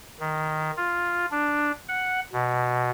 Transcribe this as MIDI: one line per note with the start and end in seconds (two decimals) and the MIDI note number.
0.20 0.71 51
0.77 1.26 65
1.31 1.72 62
1.89 2.20 78
2.33 2.91 47